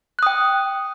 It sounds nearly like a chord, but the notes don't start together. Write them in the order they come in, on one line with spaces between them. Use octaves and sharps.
F#6 D#6 G5